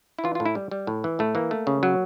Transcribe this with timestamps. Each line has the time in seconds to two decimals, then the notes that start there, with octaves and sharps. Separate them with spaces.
0.19 E4
0.24 E3 F4
0.35 F4
0.40 A2
0.45 E4
0.55 G3
0.71 G3
0.87 A2
1.04 E3
1.19 A2 A3
1.35 E3 A#3
1.51 A3
1.67 C#3
1.83 F#3